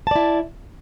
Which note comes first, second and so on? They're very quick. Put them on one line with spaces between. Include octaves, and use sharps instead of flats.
A5 D5 E4